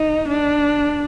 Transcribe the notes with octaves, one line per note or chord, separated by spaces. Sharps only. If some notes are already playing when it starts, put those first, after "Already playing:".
Already playing: D#4
D4